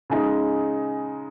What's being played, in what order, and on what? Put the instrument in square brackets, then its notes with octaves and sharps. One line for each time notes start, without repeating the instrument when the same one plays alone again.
[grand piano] C#3 G#3 D#4